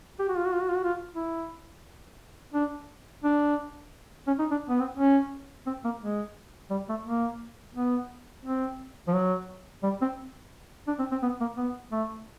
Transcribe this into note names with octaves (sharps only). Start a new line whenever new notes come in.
G4
F#4
F4
F#4
F4
F#4
F4
F#4
F4
E4
D4
D4
C#4
D#4
D4
B3
C4
C#4
C4
A#3
G#3
G3
A3
A#3
B3
C4
F3
F#3
G3
C4
D4
C4
C4
B3
A#3
B3
A3